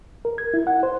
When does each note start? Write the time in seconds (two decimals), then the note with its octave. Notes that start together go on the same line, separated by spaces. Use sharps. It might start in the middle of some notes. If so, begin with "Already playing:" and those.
0.25 A#4
0.38 G#6
0.54 E4
0.67 F#5
0.83 C5